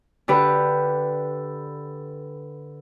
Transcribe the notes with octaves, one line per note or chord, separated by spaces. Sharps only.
D3 G4 B4